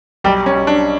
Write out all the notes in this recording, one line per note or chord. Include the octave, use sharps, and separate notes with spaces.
B1 G3 G4
C#4
B1
D4